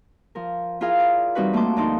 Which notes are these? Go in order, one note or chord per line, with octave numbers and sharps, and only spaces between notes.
F3 A#4
E4 F4 G#4 A#4 F5
D5
E3 G3 C4 D#4 F#4 B4
A3 A#3 A5 C6 D6
D2 F3 D#4 D5 C6